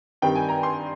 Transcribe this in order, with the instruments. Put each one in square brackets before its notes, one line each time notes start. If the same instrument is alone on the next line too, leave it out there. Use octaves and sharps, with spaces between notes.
[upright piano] G2 D#3 G3 C4 G5
G#5
A#5
C6